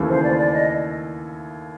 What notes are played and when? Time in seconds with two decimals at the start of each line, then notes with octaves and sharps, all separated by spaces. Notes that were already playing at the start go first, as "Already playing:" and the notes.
Already playing: D#2 C#3 E3 A3
0.09 C5
0.23 D5
0.38 D5
0.54 D#5